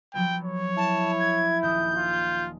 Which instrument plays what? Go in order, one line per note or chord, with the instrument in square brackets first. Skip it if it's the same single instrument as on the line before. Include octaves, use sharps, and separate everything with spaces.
[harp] F3 F#3 B3 [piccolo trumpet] G5
[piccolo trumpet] C#5
[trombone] E4 [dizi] A5
[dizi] G#6
[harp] D#1 D#6 [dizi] G6
[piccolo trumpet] F4